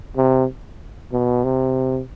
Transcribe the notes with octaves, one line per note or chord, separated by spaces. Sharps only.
C3
B2
C3